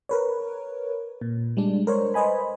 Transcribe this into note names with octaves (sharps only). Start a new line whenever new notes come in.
A#4 B4 C#5
A#2
G3 G#3 D4
A#4 C5 C#5
B4 C5 D#5 G#5 B5